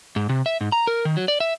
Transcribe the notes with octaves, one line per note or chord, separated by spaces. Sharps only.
G#2
C3
E5
G#2
A#5
A#4
D#3
F#3
D5
E5